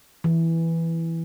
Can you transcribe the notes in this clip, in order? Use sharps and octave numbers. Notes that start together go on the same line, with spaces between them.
E3